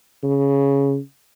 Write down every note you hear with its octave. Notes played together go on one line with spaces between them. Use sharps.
C#3